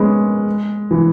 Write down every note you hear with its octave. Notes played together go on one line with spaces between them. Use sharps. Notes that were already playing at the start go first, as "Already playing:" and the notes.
Already playing: G#3 B3 C#4
E3